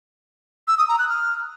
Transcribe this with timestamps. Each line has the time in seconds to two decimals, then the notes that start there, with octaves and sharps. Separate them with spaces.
0.68 E6
0.78 D#6
0.88 A#5
0.99 F#6
1.09 F6